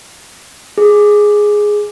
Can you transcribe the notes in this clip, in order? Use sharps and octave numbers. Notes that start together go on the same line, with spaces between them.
G#4